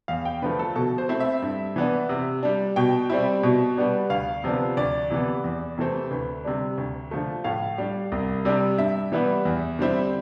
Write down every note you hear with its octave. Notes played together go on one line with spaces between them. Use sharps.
E2 F5
G5
D3 F3 A3 B4
A4
B2 A4
C5
A3 C4 E4
E5
G2
E3 B3 D4
C3
G3 D4
B2 G5
G3 C4 E4
B2
G3 B3 D4
D2 F5
C3 F3 B3 D4
D2 D5
C3 E3 B3
E2
C3 E3 A3 C4
D2 B4
C3 G3 D4
D2
D3 F3 A3
A2 F5
G3 D4
C2
C3 G3 D4
G2 E5
E3 G3 B3 E4
E2
D3 G3 C4 E4